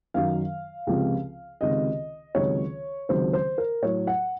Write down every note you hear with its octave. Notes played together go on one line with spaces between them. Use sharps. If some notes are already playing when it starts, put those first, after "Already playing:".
F#2 D#3 F#3 F5
C#2 C3 F3
C#2 C3 D#3 D#5
C#2 C3 D#3 F#3 C#5
C#2 C3 D#3 F#3 C5
C5
A#4
A2 F#3 C#5
F#5